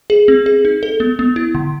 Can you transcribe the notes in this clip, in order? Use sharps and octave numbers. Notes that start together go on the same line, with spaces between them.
G#4
C4
G#4
D#4
A4
B3
B3
E4
D3